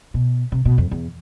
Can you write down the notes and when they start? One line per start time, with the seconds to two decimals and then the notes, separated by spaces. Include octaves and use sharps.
0.14 B2
0.52 C3
0.65 B2
0.78 F2
0.91 E2